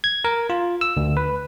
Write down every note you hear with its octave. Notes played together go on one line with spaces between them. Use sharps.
G#6
A#4
F4
E6
D2
B4